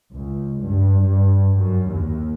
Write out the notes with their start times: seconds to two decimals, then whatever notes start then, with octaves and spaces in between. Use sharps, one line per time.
0.15 C#2
0.64 G2
1.03 G2
1.57 F#2
1.89 D#2